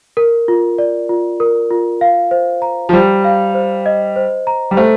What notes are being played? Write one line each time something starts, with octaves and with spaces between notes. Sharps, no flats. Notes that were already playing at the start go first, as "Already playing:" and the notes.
A#4
F4
D5
F4
A#4
F4
F5
C5
A#5
F3
G3 C5
F5
C5
D#5
C5
A#5
G3
A3 C5